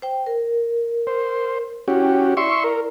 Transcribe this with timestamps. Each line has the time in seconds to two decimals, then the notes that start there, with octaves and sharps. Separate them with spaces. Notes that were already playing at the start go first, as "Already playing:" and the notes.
0.02 C5 G5
0.26 A#4
1.07 C5
1.88 C#4 E4 F#4 G4 G5
2.37 E4 D5 E5 C6 C#6
2.64 A#4